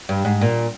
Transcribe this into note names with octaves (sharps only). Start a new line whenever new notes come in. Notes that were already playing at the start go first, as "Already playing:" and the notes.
G2
G#2
A#2